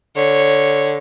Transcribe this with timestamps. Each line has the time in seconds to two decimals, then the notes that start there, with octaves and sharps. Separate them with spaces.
0.16 D3 C#5